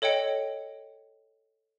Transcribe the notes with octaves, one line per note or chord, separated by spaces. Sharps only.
A4 C#5 D#5 G5 C#7